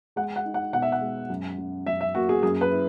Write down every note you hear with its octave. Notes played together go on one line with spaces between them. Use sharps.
G#3 F#5
F#5
D#4
F#5
B2 F#5
E5
F#5
G#3
F#2
F#2
F#2 E5
E5
A#3 F#4
G#4
F#2 G#4
B4
E4